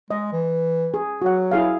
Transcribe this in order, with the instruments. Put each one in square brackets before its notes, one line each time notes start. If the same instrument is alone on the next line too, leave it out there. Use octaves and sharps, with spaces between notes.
[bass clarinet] G#3 [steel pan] D#5
[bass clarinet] E3
[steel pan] G#4
[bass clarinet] F#3 [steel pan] F#4 F#5
[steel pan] E4 G#4 F5